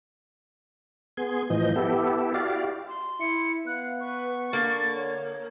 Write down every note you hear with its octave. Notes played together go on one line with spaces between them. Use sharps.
B3 G#4 C6 G#6
A2 E3 F3 D#5 G6
B3 E4 G4 A4
E4 F#4 G4 D5 F5
C6
E4 C#7
B3 F5 F#6
B4 C#6
D3 A#3 A6
C#5